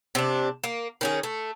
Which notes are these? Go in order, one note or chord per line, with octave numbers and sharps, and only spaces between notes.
C3 D4
A#3
D#3 C#4 G#4
A3